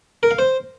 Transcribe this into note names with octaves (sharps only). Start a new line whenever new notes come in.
A#4
F5
C5